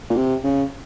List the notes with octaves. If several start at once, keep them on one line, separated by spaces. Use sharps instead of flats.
A#2
C3
C#3